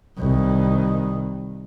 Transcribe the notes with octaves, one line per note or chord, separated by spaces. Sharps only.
C2 D#3